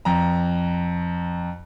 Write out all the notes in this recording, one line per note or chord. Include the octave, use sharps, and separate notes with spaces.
F2 A#5